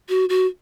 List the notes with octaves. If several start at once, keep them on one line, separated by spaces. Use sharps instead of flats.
F#4
F#4